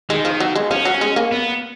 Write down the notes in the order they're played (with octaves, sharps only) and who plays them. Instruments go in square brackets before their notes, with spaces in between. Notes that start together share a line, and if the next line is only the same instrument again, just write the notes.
[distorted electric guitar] D#3 [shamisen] G#3
[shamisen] F3
F#3
G#3
[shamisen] F3 [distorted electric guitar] C#4
[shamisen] F#3
G#3
A#3
[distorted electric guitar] B3